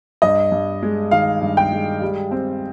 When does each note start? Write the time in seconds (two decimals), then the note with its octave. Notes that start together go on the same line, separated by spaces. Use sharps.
0.22 G2 D#5
0.52 G2
0.83 G#3
1.11 D#3 F5
1.41 G2
1.57 G5
1.72 G#3
2.02 G3
2.31 C4